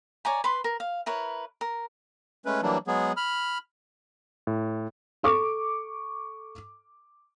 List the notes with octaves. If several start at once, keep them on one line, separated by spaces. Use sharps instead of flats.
C#5 D5 G#5 A#5
B4 B5 C6
A#4
F5
E4 A#4 B4 C#5
A#4
G#3 A3 C#4 B4
E3 F#3 G3 A#3 D4
F#3 G#3 B3 G#4
B5 F6
A2
A4 C#6 D6